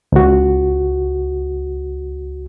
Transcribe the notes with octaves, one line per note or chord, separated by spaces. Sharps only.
C#2 F#4